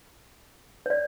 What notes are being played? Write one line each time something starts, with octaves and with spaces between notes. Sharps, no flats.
C#5
D5